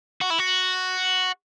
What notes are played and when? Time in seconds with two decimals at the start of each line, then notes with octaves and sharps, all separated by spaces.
0.21 F#4
0.30 E4
0.39 F#4